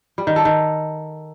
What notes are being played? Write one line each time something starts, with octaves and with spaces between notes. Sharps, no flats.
G3
D#3
A4
D#3